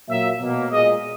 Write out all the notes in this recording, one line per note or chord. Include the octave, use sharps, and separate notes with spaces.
A#2 F#3 A#3 E5
B2 A#3
A#2 G#3 D#5